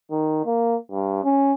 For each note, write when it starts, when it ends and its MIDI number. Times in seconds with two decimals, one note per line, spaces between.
0.11 0.43 51
0.46 0.76 58
0.91 1.21 43
1.24 1.53 61